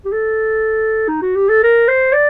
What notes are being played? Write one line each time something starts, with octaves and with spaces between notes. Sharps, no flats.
G4
A4
D#4
F#4
G4
A4
A#4
C5
D5